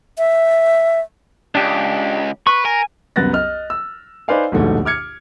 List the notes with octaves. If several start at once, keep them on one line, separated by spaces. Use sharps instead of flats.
E5
C#2 D4 G4
B4 C#6
A#4 G#5
C2 F#2 B3 F#6 A6 A#6
D#5 F6
E6
D#4 B4 C5 D5 F5 G#5
A#1 D#2 G#2 B2 A3
D6 F6 G#6 C#7